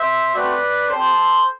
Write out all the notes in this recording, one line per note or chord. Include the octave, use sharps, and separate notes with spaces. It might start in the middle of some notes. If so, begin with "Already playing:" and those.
Already playing: C5 E5
A3 C4 F#4 B4 D5
C4 G4 A4 C5